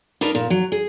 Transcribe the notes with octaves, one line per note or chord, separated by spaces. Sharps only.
D4 D#4 A#4 B4
A#2
F#3
G#4